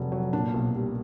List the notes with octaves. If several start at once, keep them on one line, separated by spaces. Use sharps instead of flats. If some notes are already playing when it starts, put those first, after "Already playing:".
Already playing: F1 F#3
F#3
A#2 D4
B1
G3